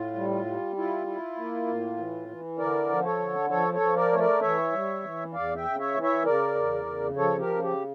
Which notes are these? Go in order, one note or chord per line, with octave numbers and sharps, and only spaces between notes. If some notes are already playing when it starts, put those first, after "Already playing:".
Already playing: A2 F4
G3
F4
G3
E4 F4
E4
A#3
A2
E3
E3
D3 A#4 D5
F3
A4 C#5
D3
F3 A4 C#5
A4 C#5
F3
A#4 D5
A3 C#5
A#4 D5
E3 C#5 E5
G3
E3
E2 D5 F5
E5 G5
C#3
C#5 E5
E3
C#5 E5
C#3 A#4 D5
E2
C#3
F3 A4 C#5
G4 A#4
C#3
G4